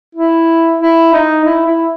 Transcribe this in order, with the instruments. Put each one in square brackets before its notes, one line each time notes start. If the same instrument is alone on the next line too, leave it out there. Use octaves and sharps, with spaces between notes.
[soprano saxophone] E4
E4
D#4
E4
E4